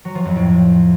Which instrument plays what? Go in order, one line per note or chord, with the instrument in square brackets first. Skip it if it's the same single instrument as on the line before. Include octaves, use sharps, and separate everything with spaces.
[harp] F#3
F3
F2
A2